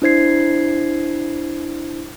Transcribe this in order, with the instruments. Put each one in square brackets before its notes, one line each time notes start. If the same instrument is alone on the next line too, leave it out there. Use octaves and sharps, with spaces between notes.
[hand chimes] D4 E4 C5 G#6 C7